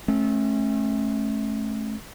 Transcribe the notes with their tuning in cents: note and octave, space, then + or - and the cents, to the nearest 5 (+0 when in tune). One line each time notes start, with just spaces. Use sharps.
A3 -30 C#4 -35